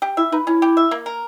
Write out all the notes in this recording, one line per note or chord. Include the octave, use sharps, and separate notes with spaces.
G4
E4 E5
D#4 B4
C#4 E4
G4
E5
A#3
A#4